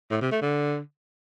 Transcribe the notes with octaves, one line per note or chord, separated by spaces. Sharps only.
A2
C3
A3
D3